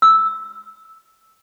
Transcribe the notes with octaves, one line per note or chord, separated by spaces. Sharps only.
E6